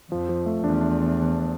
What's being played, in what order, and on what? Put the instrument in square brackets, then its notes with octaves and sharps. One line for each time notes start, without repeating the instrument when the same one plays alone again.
[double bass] F2 [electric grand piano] F3
[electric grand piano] F3
A3
[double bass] E2 [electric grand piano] D4
[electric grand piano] D4